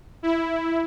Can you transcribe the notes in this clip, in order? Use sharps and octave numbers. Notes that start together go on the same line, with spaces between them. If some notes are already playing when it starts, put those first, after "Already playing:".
E4